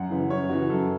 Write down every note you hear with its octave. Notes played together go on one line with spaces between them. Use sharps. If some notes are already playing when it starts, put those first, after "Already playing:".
Already playing: F#2 F#5
C#3 E3
F#2 C#5
C#3 E3 F#4
F#2 A4